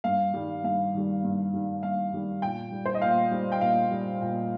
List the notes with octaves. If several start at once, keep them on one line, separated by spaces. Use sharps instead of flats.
G2 F5
D#3 G3
G2 F5
D#3 G3
G2
D#3 G3
G2 F5
D#3 G3
A#2 G5
G3
C5
D#5
A#2 F5
G3
G5
A#2 F5
G3
A#2